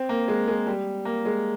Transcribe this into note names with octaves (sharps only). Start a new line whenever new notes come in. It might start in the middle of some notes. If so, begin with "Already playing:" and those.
Already playing: C4
A#3
G#3
G#3
G3
A#3
G#3